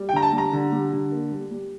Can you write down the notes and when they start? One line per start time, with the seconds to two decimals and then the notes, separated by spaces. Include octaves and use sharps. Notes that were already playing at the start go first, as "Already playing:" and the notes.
Already playing: G3
0.09 G5
0.13 D3 A#5
0.22 A5
0.33 G3
0.38 A#5
0.53 D3
0.72 G3
0.93 D3
1.12 A#3
1.32 G3
1.51 G3